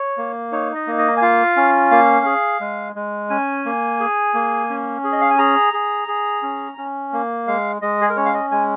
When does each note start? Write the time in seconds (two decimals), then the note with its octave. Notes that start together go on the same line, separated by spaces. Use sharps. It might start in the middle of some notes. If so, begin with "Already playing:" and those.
Already playing: C#5
0.18 A#3
0.52 D#4 C#5
0.75 D#5
0.87 A#3
0.99 D#5
1.17 G#5
1.22 F4 F5
1.56 C#4
1.91 A#3 F5
2.26 G#4
2.61 G#3
2.96 G#3
3.30 C#4 G#5
3.65 A#3
4.00 G#4
4.34 A#3
4.70 C#4
5.04 G#4
5.12 D#5
5.21 F5
5.30 G#5
5.39 G#4 A#5
5.74 G#4
6.08 G#4
6.43 C#4
6.78 C#4
7.13 A#3
7.47 G#3 F5
7.82 G#3 D#5
8.01 G#4
8.09 A#4
8.17 C#4 C#5
8.26 F5
8.34 D#5
8.51 G#3 G#5